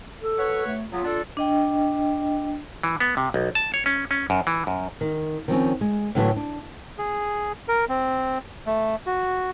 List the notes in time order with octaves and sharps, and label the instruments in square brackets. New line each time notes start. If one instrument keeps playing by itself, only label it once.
[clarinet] A4
[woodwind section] F#4 B4 C#5
[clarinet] A3
[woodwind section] C#3 F#3 B3 [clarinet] F4
[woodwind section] D4 A4
[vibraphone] D4 D#5 G5
[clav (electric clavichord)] E3
B3
C3
B1
A5
C#5
C#4
C#4
F#2
E3
F#2
[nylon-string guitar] D#3
D#3 F3 C4 C#4
G#3
A2 D3 E3 F#3 A3 B3
D4
[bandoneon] G#4
A#4
C4
A3
F#4